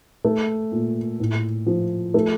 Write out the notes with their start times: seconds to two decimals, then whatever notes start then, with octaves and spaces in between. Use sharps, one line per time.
0.25 A3
0.72 A#2
1.20 A2
1.67 F3
2.14 A3